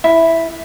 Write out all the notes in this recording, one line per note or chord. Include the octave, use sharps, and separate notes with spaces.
E4